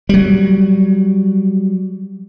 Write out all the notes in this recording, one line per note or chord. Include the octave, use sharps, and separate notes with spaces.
F#3 G3